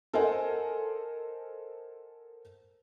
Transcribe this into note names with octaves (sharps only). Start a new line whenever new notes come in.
A4 A#4 C5 D#5 F#5 G#5